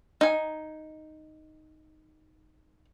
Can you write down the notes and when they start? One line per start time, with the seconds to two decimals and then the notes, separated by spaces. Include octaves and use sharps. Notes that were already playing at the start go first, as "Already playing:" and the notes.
0.21 D#4 G#5